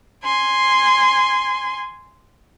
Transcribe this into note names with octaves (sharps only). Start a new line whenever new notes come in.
G#5 C6